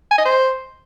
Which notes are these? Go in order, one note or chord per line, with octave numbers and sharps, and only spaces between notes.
G#5
D#5
C5